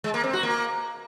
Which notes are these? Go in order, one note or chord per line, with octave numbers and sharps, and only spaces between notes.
G#3
A#3
C4
F#4
A#3